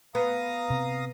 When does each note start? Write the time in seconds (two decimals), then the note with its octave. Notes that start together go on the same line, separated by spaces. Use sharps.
0.15 B3 F5 A#5 D#6
0.70 C3